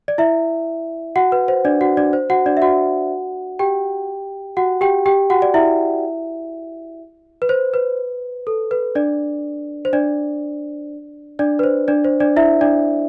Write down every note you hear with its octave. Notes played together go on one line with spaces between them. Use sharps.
D5
E4 E5
F#4 F#5
B4
C5
D4 D5
F#4 F#5
D4 D5
C5
F#4 F#5
D4 D5
E5
F#4 F#5
G4 G5
F#4 F#5
G4 G5
G4 G5
F#4 F#5
D5
E4 E5
B4
C5
B4
A4
B4
D4 D5
C5
D4 D5
D4 D5
B4
C5
D4 D5
C5
D4 D5
E4 E5
D4 D5